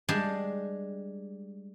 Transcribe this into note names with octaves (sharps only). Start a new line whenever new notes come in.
G3 G#3 D4 G#4